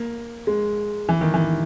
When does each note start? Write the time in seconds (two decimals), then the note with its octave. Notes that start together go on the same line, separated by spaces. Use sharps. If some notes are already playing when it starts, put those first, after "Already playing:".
Already playing: A#3
0.47 G#3
1.09 E3
1.21 D#3
1.34 E3